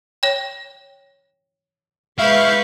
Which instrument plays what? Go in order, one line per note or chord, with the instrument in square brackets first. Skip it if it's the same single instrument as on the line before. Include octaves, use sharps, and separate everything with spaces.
[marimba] C#5 G5
[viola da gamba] G#3 B4 [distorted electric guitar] E4 [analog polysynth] F5 C#6 G6